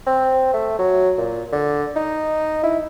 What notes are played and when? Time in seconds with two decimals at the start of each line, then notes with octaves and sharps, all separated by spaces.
0.07 C4
0.53 A3
0.79 F#3
1.18 A#2
1.53 D3
1.96 D#4
2.64 E4